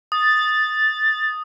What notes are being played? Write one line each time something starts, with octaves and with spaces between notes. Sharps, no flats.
D#6 A6